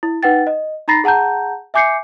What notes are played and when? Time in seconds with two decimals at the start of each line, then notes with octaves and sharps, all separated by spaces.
0.03 E4
0.23 D#4 B4 F#5 G5 A6
0.47 D#5
0.88 D#4 A#5 B5 A6 A#6 C7
1.04 G#4 F#5 A5 A#5 G6
1.74 E5 G#5 D6 G6 C7 C#7